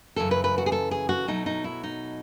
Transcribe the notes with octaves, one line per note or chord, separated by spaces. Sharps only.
F#2 C#3 E3 A3 A4
B4
B4
F#4
G#4
A4
G#4
F#4
B2 F#3 A3 D#4
D#4
E4
D#4